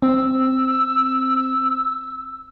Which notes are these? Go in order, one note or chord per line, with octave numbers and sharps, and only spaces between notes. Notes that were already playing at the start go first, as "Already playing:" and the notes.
C4 E6